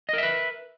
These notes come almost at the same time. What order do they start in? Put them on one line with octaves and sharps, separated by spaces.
D#5 A#4 E5 B4